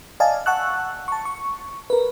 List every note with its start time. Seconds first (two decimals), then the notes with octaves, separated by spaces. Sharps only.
0.20 D5 D#5 F5 G#5 A5
0.46 F#5 A5 C#6 E6 F#6
1.08 A5 C#6
1.25 C#6
1.90 A#4 B4